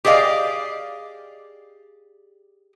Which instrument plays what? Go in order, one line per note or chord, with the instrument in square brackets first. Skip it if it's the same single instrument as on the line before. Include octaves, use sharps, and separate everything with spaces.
[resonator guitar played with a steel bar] G4 G#4 D5 D#5 F5